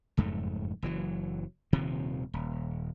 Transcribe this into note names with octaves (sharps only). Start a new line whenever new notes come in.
F#1 F2 G#2 A3
F#1 E3 F#3
D#1 C3 D#3 F3
D#1